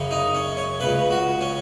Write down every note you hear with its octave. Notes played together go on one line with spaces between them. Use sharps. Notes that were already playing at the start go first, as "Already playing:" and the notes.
Already playing: F#2 C#3
D#4
C#4
C#5
C#2 C#3 B4
F#4
C#4